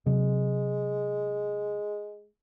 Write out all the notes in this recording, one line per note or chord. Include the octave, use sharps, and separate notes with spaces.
C3 F#3 G#3 C4